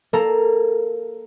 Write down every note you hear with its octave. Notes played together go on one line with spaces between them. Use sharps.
A#3 A4 A#5